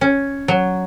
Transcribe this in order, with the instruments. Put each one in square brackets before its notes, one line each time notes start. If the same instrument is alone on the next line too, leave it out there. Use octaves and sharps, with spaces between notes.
[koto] C#4
F#3